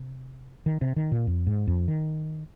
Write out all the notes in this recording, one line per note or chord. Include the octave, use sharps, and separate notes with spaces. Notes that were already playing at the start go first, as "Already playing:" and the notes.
Already playing: C3
D#3
C3
D#3
A#2
F2
G#2
F2
D#3